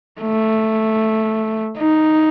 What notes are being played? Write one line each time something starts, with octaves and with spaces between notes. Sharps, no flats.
A3
D#4